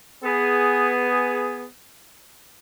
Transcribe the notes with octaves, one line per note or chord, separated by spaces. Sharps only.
B3 G#4